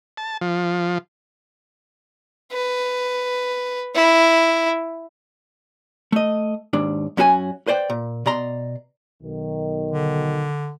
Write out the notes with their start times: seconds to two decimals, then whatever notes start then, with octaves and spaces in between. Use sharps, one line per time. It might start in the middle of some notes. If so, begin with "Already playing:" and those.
0.17 A5
0.41 F3
2.52 B4
3.95 E4
6.12 A3 D#5
6.73 D#2 G#2 D4
7.17 F#2 C#4 F#4 A#4 G#5
7.67 B4 C5 D5 G5
7.90 A#2
8.26 B2 D5 A#5 C6
9.23 B1 D#3
9.91 D3